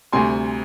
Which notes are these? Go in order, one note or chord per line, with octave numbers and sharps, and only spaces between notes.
D2 C3 G3 G#5 C6